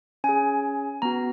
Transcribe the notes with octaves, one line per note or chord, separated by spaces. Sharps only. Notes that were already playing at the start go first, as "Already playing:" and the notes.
C#4 G#4 G#5
B3 F#4 A#5